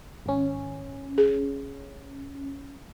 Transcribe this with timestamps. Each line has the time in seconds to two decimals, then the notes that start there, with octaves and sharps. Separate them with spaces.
0.26 G#1 C#4
1.18 G#4